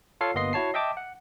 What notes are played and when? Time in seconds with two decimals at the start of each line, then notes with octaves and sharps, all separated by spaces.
0.21 F4 A4 C#5 F5 C7
0.34 G1 A#3 B3 D#5 C6 C7
0.53 E4 F#4 C#5 A5 C7
0.74 D#5 E5 G5 A5 D6
0.97 F#5